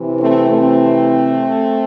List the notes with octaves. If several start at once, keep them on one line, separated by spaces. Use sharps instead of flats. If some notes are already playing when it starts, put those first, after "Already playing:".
Already playing: C3 E3
A3 C4
A3 C4